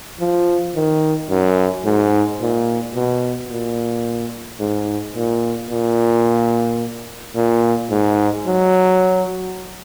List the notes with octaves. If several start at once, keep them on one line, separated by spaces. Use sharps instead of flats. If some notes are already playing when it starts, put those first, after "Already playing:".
F3
D#3
F#2
G#2
A#2
B2
A#2
G#2
A#2
A#2
A#2
G#2
F#3